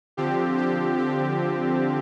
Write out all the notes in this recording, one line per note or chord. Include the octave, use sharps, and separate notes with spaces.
D3 F3 C4 G4
G4
G4